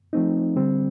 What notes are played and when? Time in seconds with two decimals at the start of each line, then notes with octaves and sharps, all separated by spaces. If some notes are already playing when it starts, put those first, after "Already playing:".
0.13 F3 A3 C4 D#4
0.56 D3 G3 C4